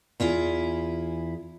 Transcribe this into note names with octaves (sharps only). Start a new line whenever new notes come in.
E2 E4 F4 G#4